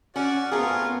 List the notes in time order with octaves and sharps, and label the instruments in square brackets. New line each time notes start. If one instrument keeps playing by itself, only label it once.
[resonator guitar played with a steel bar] C#4 [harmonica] F#4 D5
[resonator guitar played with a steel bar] A3 G#4 [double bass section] B3 C4 [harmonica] F4 A#4